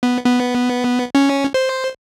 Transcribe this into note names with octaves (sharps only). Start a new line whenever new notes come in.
B3
B3
C#4
C5